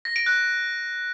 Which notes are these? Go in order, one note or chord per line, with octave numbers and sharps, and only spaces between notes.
A#6
D7
F#6